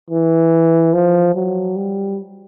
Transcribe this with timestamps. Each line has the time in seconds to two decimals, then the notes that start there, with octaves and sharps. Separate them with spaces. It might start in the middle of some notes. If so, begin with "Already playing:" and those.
0.10 E3
0.93 F3
1.35 F#3
1.76 G3